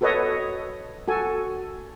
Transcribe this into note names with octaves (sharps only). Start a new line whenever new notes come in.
F#4 A4 B4 C#5 D#5
F#4 A4 G#5